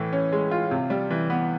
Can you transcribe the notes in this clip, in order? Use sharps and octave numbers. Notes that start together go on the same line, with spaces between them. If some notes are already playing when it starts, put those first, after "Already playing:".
Already playing: A2 E3
C#4
G#3
F4
C3
G3
E3
B3